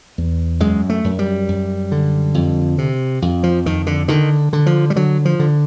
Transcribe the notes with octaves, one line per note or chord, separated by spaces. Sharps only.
E2
F#2 G#3
A3
F#2
G3
F#2
D3
F2
C3
F2
F3
F2 D#3
D3
D3 D#3
D3
F3
G3
D3 F#3
F3
D3